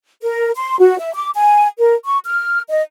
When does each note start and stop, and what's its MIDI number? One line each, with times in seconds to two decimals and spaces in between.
0.22 0.50 70
0.56 0.76 84
0.80 0.98 66
0.99 1.11 76
1.14 1.29 86
1.34 1.67 80
1.78 1.95 70
2.06 2.18 85
2.25 2.61 89
2.70 2.82 75